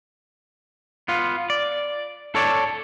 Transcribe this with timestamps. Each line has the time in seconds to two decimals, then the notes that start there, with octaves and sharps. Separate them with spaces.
1.08 B3 F4
1.50 D5
2.35 A4 C#5 D5